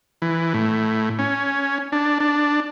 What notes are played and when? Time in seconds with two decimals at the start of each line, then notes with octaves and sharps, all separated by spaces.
0.22 E3
0.54 A2
1.19 C#4
1.92 D4
2.20 D4